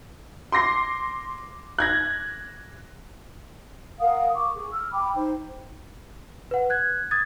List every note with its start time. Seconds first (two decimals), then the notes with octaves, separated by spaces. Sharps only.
0.52 C6 D6 A#6 C7
1.79 F#6 G#6 A#6
4.00 A#4 F5 F#5 D#6
4.34 C#6 D6
4.56 G#4
4.72 E6 F6
4.92 G5 B5 D6
5.15 D#4 C5
6.51 B4 F#5
6.70 F#6 G#6
7.11 D#6 G#6 A6